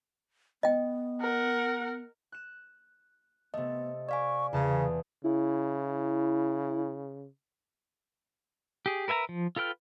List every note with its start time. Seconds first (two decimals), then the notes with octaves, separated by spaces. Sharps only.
0.63 B3 D#5 G5
1.22 A#4 F#5
2.32 F#6 E7
3.54 C3 A3 B3 D#5
4.09 D5 F5 G#5 C#6
4.53 E2 C#3 G#4 A5 D#6
5.24 C#3 E4
8.86 G4 G#4
9.08 A#4 B4 E5 G#5 A#5
9.29 F3
9.56 F4 A4 B4 G5 F6